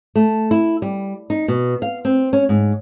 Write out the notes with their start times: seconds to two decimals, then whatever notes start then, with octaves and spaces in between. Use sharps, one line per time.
0.15 A3
0.51 E4
0.82 G3
1.30 D#4
1.48 B2
1.82 F5
2.05 C4
2.33 C#4
2.49 G#2